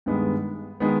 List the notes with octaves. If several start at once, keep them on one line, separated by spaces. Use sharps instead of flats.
G2 D#3 G#3 B3
D#3 G#3 B3